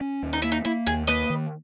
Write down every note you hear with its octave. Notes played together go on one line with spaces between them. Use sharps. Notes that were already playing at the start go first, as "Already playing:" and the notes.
C#4
D#2
D#4
A#3 E4
D#4
A#3 E4
D#2 G#4
A#3 B4 D#5
D#3